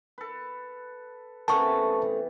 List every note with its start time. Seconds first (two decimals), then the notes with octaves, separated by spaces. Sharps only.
0.18 A4 B4
1.48 C3 E3 A3 B3 C#4 A#4 A5 C#6